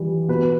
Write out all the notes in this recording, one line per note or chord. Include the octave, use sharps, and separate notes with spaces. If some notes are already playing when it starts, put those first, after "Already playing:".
Already playing: E3 G3
B2 B4